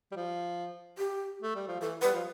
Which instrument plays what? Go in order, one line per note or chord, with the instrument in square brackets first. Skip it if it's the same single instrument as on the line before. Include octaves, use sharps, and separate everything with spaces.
[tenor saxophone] G3
F3
[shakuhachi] G4
[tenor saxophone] A3
G3
F3
[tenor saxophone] E3 [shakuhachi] A4
[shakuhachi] B4
[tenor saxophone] G3
F3